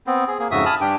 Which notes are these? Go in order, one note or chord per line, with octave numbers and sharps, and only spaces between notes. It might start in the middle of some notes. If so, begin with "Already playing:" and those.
B3 C4
G#4
A#3 G#4
F2 G#2 C#3 F#4 E5 D#6
G#5 A5 B5 D#6 F6
G2 D4 G4 G5